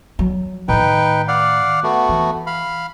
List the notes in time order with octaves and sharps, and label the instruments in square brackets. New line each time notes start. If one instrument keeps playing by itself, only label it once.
[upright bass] F#3
[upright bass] A2 D#3 [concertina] D#4 B4 G5
[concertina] D5 F5 F#5
A3 B3 F#4
[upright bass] E3
[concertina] F5 B5